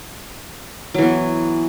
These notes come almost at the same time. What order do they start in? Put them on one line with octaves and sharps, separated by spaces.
F#3 E3 B3